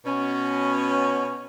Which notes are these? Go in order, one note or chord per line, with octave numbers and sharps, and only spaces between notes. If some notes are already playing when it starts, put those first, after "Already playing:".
B2 C#4